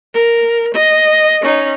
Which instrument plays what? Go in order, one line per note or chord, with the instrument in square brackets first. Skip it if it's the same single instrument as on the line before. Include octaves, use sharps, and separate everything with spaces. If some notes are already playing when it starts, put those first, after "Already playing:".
[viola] A#4
D#5
C#4 D#4